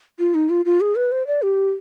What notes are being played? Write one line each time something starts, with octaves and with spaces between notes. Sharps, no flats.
F4
D#4
F4
F4
G#4
B4
C5
D5
G4